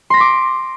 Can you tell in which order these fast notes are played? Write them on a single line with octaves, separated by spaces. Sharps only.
C6 A#6 B6 D6